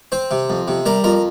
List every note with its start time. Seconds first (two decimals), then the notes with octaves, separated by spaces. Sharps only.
0.12 C4 C5
0.31 C3
0.50 F2
0.68 C3
0.86 G3 A#4
1.04 F2 A#4